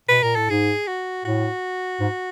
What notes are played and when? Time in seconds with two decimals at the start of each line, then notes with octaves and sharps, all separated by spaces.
0.09 B2 B4
0.23 A#2 A#4
0.36 A2 A4
0.50 G#2 G#4
0.87 F#4
1.25 A2 F#4
2.00 G#2